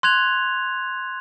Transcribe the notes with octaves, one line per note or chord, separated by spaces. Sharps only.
C6 F#6 G#6 F7